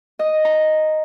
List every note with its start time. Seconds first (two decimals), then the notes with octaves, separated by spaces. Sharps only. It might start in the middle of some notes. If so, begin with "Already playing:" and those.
0.19 D#5
0.45 A#5